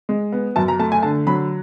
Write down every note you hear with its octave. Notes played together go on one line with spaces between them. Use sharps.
G#3
B3
F#2 A5
A#5
A3 A5
G#5
D3 A5
F#3 B5